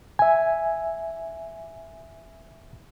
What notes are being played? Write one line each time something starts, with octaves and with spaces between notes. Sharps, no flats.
E5 G#5